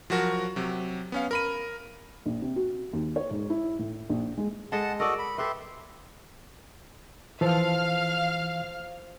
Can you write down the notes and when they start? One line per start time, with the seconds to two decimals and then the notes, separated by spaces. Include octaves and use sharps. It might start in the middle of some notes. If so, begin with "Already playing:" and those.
0.10 F3 F#3 F#4 A#4
0.56 C3 F#3
1.12 B3 C#4 F5
1.31 A#4 B5 D#7
2.26 A#1
2.42 C3
2.56 F#4
2.93 D#2
3.16 C#5
3.31 G#2
3.50 E4
3.79 A2
4.10 A#1
4.38 G#3
4.72 G#3 A4 D#5 F#5 A5
5.00 F#4 A4 A#4 D5 D#5
5.19 B5
5.38 G4 A4 B4 E5 C6
7.41 E3 F3 A4 F5 F6